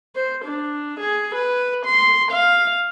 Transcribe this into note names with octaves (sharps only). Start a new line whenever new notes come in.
C5
D4
G#4
B4
C6
F5